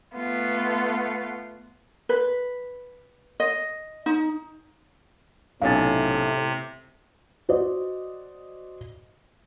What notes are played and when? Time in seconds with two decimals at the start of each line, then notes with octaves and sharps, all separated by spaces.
0.16 A3 B3 F4
2.09 B4
3.40 D#5
4.06 D#4
5.62 B1 A2 C3 C#4 F5 G#5 A6
7.49 F#4 C5 D5 D#5